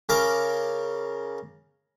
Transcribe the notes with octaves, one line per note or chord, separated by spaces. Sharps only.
C#3 A#4 D6